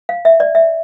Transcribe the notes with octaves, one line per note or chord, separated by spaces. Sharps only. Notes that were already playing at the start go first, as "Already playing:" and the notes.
F5
E5
D5
E5